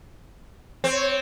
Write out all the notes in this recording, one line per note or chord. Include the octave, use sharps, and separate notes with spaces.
C4 C#5